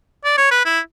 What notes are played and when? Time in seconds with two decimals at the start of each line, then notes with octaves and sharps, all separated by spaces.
0.25 D5
0.38 C#5
0.51 B4
0.65 E4